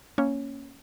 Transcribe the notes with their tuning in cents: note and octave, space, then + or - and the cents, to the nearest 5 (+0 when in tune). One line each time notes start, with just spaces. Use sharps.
A#3 +0 C#4 +0 C#5 +0